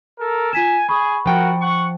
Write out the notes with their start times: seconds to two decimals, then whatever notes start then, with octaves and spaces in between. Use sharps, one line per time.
0.19 A4 A#4
0.53 F4 G#5 B6 E7
0.89 G#4 B5 C#6
1.26 F3 F#4 A#4 F#5 G5
1.61 F#5 C#6